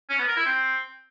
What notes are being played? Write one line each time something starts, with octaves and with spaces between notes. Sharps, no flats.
C#4
B3
A#4
E4
C4